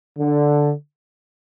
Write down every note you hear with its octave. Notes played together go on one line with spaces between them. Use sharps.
D3